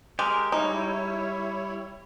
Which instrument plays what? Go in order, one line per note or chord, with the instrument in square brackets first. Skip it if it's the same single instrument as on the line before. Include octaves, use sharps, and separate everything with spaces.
[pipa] G#3 [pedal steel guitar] G4 A#4
[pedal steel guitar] G3 [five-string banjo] D#4 [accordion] E4 C#5